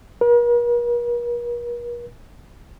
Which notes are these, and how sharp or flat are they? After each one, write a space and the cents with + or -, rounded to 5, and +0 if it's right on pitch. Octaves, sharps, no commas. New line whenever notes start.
A#4 +45